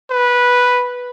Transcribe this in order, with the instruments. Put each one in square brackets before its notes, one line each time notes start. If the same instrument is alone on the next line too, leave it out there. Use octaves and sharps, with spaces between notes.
[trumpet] B4